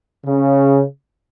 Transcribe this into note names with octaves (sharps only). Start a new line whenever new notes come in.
C#3